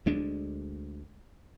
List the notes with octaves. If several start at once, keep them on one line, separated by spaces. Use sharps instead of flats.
D2 G#3 D4